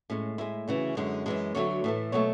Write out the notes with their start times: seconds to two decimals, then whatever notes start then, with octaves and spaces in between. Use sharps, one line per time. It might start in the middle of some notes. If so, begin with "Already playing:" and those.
0.10 A2 G#3 C#4
0.38 A2 G#3 E4
0.68 D2 C#3 E3
0.97 F#2 D3 G#3
1.26 F#2 E3 G#3
1.55 D2 D3 F#3 A3 C#5
1.84 A2 E3 A3
2.12 B2 F#3 A3 C#5